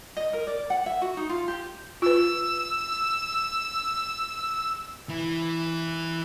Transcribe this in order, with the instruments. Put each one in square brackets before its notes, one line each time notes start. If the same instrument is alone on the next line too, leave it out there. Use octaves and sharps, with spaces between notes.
[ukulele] D#5
A#4
D5
F#5
E5
F#4
D#4
F4
G4
[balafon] F4 B4 [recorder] E6
[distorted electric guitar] E3 E4